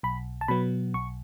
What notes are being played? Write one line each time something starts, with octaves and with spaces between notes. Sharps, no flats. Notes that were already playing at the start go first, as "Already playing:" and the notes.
B1 B5
A5
B2 F#3 B3 B5
B1 C#6